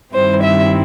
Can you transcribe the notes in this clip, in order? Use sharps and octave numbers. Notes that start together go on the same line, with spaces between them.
G2 D#3 G3 C4 E4 C5
E5